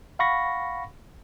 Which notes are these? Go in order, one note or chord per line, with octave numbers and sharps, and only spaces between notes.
F5 F#5 B5 C#6 A#6